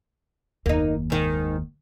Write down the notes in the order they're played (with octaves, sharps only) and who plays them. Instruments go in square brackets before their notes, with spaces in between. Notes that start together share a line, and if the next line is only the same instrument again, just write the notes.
[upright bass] F#1 D#2 [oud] A#3 D#4
[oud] G#2 D#3